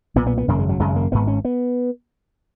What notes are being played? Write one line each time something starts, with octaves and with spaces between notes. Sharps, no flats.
B1 A#2 B3
B3
B3
G#1 F#2 C#3 A#3
G#3
F#3
G#1 F#2 C#3 G#3
A#3
G#1 G#2 B3
C#4
B3